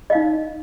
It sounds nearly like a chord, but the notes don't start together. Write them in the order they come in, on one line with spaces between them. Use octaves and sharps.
D#5 F5 D#4